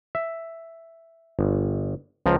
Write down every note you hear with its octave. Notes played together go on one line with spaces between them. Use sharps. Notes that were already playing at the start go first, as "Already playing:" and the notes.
E5
G1
C#2 F3 A#5